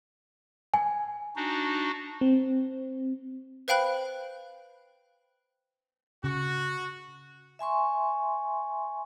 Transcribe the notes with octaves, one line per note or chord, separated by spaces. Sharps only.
G#5
D4 D#4 F#4
C4
B4 C5 F5 G5 B5 F#6
C#3 F#4
E5 G#5 C6 C#6